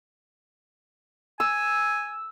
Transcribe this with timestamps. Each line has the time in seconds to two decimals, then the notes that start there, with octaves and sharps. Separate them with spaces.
1.40 G#5 E6